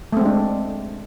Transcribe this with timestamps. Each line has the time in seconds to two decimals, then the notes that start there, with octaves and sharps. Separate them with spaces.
0.13 A3
0.17 C4
0.21 G#3
0.25 D4